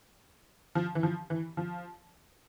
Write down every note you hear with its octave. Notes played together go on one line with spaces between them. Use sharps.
F3
E3
F3
E3
F3